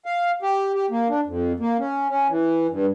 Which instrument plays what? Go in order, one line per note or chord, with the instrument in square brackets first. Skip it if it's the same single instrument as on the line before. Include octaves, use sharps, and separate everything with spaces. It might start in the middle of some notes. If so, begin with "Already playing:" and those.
[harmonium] F5
G4
G4
A#3
D4
F2
A#3
C#4
C#4
E3
G2